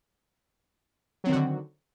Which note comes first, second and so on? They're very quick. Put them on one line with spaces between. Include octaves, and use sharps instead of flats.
F#3 C4 D#3 F#4 D3